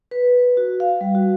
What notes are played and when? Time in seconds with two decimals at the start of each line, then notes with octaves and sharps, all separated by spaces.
0.11 B4
0.57 F#4
0.80 F5
1.01 G3
1.15 F#4